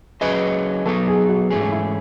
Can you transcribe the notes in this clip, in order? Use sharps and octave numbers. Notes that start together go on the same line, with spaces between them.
F#3 C#4 G#4 B4 D#5
F#3 B3 D#4 A4
G#4
F#4
G#2 E3 A3 C#4 G#4
E4